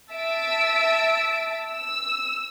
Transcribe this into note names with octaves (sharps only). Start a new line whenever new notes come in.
E5 A5 E6 B6 D7
E6